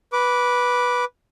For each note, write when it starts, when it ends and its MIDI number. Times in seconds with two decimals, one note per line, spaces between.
0.13 1.05 71
0.13 1.05 86